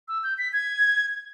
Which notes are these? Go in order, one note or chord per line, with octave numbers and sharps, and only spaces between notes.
E6
G6
B6
G#6